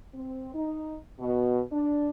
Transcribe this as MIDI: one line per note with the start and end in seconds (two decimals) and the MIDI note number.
0.14 0.50 60
0.54 0.96 63
1.19 1.61 47
1.71 2.10 62